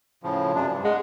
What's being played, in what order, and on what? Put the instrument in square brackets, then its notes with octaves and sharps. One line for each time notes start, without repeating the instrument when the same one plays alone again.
[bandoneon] A2 C#3 F3
F#2 C3 D4
G2
[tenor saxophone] G#3 [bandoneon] F#5